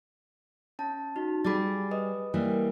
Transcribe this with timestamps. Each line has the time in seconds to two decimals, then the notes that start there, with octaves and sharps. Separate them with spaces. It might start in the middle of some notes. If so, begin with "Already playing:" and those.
0.79 C#4 A5
1.16 D#4 F#4
1.45 G3 G#4 B5 D6 A6
1.91 B4 D#5 D#6
2.34 E3 G3 A#3